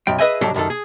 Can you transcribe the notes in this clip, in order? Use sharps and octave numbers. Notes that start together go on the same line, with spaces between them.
B1 F#2 G5
G#4 B4 D#5 E5 G5 G#5
C2 G#2 F#3 D4 G4 A4
C2 F#2 D#3 A4
G#4